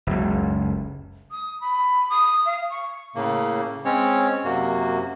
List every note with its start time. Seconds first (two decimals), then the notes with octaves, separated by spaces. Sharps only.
0.07 F#1 C#2
1.31 D#6
1.61 B5
2.10 D#6
2.46 F5
2.70 C#6
3.15 A2 C#3 A#3
3.85 G#3 C4 C#4 C#5
4.45 F#2 C3 A#3 F#4